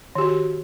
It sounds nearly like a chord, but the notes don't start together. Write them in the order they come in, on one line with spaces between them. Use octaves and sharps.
D#3 G4 F#4